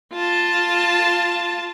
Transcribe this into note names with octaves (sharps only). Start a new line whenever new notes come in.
F4 A5